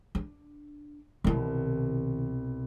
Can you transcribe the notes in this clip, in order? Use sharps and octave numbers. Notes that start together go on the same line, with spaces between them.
D4
C2 B2 D#3 E4